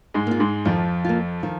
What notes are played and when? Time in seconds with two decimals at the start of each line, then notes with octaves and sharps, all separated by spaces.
0.14 G#2 G#3
0.27 A#3 F4
0.40 G#2 G#3
0.65 F2 D#3 F3
1.05 A#3 F4
1.43 D#3 F3